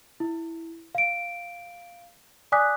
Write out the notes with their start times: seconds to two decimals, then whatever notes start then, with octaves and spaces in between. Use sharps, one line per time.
0.20 E4
0.95 F5 D7
2.52 D5 G#5 D6 D#6 F#6 B6